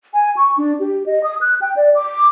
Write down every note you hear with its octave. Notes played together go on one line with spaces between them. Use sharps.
G#5
C#6
D4
G4
D#5
D#6
F#6
G5
D5
D6